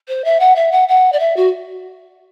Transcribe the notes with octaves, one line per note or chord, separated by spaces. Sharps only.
C5
E5
F#5
E5
F#5
F#5
D5
E5
F#4